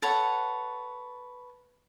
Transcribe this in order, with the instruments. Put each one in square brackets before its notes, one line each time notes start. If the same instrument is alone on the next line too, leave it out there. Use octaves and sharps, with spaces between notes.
[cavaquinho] A4 B4 C#5 F#5